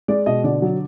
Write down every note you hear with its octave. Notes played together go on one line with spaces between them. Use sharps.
G#3 D5
B2 D#5
D3 D5
F#3